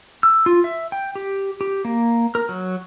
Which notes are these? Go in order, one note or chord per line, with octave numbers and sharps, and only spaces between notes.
E6
F4
E5
G5
G4
G4
A#3
A#4
F#3